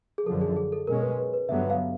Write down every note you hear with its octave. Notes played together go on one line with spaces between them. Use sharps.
G#4
F#2 D3 F3 A4
G#4
G#4
A4
B2 G#3 C#4 A#4
B4
B4
B4
G2 D3 F#3 B3 E5
F5